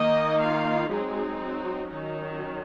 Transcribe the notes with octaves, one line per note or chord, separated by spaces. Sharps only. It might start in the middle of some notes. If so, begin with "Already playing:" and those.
Already playing: D#3 A#3 D#4 D#5
F4 F5
F#3 G#3 C4 D#4 G#4
F#3 F#4
D#3 F#3 C#4 D#4